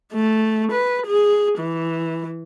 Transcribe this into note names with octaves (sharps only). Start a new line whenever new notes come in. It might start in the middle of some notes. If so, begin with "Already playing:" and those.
A3
B4
G#4
E3